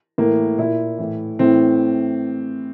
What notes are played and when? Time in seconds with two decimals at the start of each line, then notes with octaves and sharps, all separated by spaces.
0.18 A2 E3 A#3
0.58 A#2 E4
0.98 A2 E3
1.39 A2 E3 C4